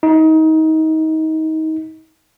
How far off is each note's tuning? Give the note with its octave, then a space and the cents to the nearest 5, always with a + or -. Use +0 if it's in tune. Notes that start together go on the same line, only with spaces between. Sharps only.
D#4 +25